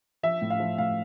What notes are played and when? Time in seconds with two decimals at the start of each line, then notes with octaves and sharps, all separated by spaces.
0.23 F3 E5
0.41 A2
0.50 F5
0.60 F3
0.78 A2 F5